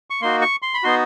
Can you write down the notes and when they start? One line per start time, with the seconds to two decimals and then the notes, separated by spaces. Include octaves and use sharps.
0.10 C#6
0.21 A#3 D#4 F#4 C6
0.42 C#6
0.62 C6
0.74 B5
0.83 B3 D#4 F#4 C6